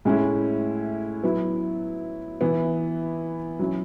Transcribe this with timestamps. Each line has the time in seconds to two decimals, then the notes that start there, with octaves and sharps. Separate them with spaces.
0.05 A2 G#3 C#4 E4
1.23 F#3 B3 E4
2.41 E3 B3 E4
3.59 F#3 C#4 E4